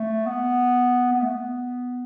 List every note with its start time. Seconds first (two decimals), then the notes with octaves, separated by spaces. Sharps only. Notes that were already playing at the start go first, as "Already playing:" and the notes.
Already playing: A3
0.27 B3
1.13 B3
1.23 A3
1.31 B3